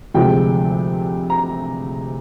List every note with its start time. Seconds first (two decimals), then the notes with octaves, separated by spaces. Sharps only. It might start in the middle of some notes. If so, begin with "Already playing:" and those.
0.14 D2 C3 F3 G#3 G5
1.30 A#5